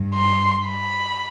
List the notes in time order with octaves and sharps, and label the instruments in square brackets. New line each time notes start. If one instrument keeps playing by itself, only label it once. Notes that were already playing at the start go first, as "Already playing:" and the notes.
Already playing: [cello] G2
[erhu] C6
B5